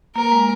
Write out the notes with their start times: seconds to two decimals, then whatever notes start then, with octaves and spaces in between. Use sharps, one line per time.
0.16 A#3 A#4
0.32 G#3